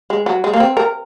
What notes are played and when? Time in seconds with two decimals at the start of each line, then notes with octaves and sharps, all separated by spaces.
0.10 G#3
0.26 F#3
0.44 G#3
0.54 A#3
0.60 C4
0.77 A#4